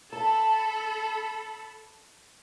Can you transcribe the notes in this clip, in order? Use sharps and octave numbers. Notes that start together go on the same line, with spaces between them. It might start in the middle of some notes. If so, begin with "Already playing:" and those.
A4 A5 B5